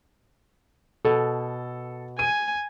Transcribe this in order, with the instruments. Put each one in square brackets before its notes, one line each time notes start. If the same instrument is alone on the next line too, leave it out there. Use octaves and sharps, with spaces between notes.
[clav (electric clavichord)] B2 [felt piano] A4
[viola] G#5 [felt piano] D#7